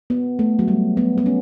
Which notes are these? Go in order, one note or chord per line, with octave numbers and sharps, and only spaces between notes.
B3
A3
F#3
G3
B3
B3
C#4